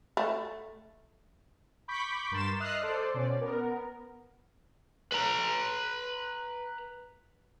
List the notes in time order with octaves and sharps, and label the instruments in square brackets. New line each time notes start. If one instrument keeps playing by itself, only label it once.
[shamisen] A3
[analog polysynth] B5 C#6 D6 G6 B6
G2 A#4 C6 A6 E7
D#5 E5 D#6 F6 F#6 C7
A4 C5 D5
B2 C#4 D5
B3 A#4
[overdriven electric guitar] B4 A#5